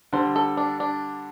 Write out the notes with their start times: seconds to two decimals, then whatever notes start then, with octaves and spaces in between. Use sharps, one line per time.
0.13 D3 G3 C5
0.36 A4
0.57 D4
0.80 D4